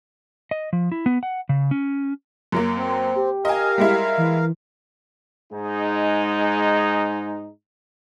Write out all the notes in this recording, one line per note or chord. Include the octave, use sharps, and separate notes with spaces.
D#5
F3
E4
B3
F#5
C#3
C#4
F#2 F#3 A#3
C4
G4
A#4 D#5 F5 G#5
G3 G#3 E4
E3
G#2 G#3 D#4